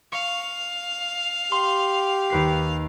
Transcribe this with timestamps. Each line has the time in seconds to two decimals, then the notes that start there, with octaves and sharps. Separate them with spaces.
0.12 F5 C#6
1.52 G4 C6
2.30 D#2 B4 C7